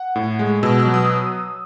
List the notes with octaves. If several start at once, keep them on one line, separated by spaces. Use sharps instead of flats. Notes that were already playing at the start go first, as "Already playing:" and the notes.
Already playing: F#5
A2
G#3
B2 E6
E6
F#3
D#6